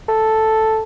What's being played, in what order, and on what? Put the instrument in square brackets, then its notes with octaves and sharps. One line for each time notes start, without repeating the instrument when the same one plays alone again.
[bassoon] A4